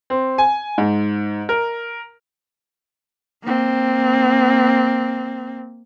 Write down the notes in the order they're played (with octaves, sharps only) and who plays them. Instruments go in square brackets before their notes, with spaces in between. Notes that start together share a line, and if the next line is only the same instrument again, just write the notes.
[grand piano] C4
G#5
G#2
A#4
[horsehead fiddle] A#3 C4